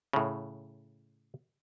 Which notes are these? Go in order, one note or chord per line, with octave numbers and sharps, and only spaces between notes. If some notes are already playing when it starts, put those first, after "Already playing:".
A2 C#3